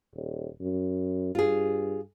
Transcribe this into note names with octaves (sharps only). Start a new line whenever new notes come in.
D#1
F#2
G2 F4 G#4